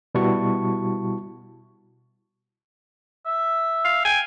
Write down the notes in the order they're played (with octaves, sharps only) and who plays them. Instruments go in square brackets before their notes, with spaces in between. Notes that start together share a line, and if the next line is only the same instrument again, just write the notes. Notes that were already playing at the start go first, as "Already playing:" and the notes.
[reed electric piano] B2 G3 E4 F#4 A5 C#6
[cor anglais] E5
[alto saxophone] F5
[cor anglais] G5 [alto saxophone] G#5